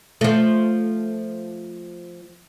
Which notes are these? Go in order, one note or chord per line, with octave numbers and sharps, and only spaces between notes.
F3 A3